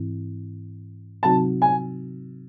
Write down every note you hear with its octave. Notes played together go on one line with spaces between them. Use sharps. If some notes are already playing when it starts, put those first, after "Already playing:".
Already playing: G#2 E3 C4 E4
C3 F#3 C4 D#4 F#4 A5
G#5